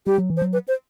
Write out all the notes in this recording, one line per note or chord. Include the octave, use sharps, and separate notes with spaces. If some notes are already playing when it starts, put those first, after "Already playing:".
G3 G4
F#3
E3
C5
F#3
B4
C5